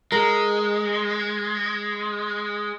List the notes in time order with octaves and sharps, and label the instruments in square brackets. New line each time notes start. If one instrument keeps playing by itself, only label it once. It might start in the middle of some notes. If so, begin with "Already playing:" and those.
[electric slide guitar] G#3 [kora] A#4